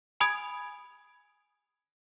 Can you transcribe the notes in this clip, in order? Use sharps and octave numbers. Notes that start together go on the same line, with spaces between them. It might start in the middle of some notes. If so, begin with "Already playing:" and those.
G#5 B5 D#6 G#6 D7